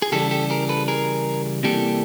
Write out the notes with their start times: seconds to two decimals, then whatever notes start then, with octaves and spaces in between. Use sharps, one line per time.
0.02 G#4
0.12 C#3 E3 G3 G4 A4
0.31 G4 A4
0.50 G#4 A#4
0.69 A4 B4
0.88 G#4 A#4
1.63 C3 E3 G3 A#3 G4 A4